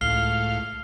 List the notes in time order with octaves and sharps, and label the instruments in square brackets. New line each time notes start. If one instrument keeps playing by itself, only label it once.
[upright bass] C#2 [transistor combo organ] A2 F5 [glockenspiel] F6 C7 G7